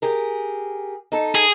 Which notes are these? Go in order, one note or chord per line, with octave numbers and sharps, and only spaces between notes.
G4 G#4 A#4
D#4 A4
G#4